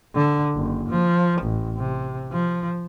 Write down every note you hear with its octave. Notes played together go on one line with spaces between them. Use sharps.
D3
F#1
F3
A1
C3
F3